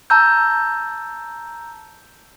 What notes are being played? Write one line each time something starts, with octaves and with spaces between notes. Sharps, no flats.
A5 A#5 E6 G6